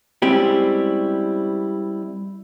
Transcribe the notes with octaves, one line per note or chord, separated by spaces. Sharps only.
G3 G#3 C4 C#4 E4 G4